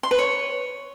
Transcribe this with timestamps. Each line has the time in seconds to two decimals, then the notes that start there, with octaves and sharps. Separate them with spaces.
0.03 C6
0.11 B4
0.19 C#5